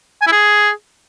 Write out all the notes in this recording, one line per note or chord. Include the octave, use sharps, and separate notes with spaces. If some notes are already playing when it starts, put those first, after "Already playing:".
G#5
E4
G#4